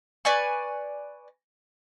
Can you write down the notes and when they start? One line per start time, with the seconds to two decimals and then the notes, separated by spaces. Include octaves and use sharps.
0.25 B4 D5 G#5 C#6